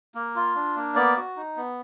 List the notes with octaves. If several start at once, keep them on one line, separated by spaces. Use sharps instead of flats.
A#3
F4
D4
A#3
B3 D5
F#4
D#4
B3